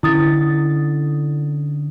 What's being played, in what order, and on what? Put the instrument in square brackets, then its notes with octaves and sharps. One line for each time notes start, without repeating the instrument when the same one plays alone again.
[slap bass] D3 C#4 [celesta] E4 D#6 A6